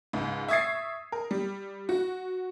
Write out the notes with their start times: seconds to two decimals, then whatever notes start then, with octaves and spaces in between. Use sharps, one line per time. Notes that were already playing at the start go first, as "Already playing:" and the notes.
0.13 C#2 G#2
0.48 E5 C#6 D#6 G#6 A6 C7
1.12 A#4
1.31 G3
1.89 F#4